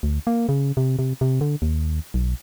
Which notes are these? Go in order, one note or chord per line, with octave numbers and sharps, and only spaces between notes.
D2
A#3
C#3
C3
C3
C3
D3
D#2
B1